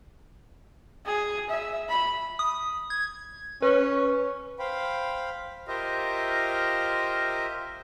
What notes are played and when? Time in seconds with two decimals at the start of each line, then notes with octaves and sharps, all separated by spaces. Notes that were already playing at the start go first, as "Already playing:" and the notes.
1.06 G#4
1.50 E5
1.89 B5
2.39 D#6
2.90 G#6
3.62 C#4 B4
4.59 C5 F5 G5 B5
5.68 F4 G4 A#4 C5 D#5 E5